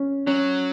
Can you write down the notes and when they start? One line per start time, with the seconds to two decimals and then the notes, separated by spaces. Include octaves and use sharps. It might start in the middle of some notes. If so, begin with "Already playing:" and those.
Already playing: C#4
0.27 F#3 C#4